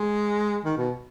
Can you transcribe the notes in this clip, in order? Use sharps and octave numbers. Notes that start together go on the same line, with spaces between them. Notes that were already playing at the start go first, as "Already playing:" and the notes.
Already playing: G#3
D#3
B2